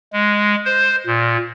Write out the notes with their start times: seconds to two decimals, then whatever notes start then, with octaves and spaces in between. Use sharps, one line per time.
0.13 G#3
0.66 C5
1.07 A#2